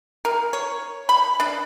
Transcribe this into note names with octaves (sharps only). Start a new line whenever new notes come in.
A#4
C#5
B5
D4